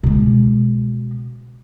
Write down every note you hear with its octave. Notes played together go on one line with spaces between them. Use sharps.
B2 G#3